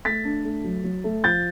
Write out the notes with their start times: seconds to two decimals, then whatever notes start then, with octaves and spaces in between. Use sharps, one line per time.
0.05 A3 A6 B6
0.25 D4
0.44 A3
0.64 F#3
0.84 F#3
1.04 A3
1.24 F3 G6 A6